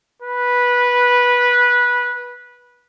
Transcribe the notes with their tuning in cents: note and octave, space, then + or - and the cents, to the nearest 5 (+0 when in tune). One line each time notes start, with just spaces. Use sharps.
B4 -15